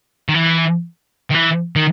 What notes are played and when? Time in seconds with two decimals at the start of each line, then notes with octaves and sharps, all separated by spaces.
0.29 D#3
0.34 E3
1.30 D#3
1.34 E3
1.76 D#3